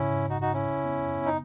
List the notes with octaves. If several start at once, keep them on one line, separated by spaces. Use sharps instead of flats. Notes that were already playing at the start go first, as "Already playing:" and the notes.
Already playing: G#2 C#3 C#4 E4
G#2
A1 D#4 F#4
D#4 F#4
G#2
C#4 E4
C#3
B3
F#2
B3
D#4